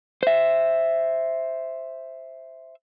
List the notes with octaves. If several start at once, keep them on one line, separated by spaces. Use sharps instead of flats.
C5 E5